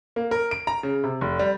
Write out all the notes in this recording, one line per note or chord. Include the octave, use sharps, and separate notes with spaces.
A#3
A#4
D7
A#5
C#3
C3
F1
G3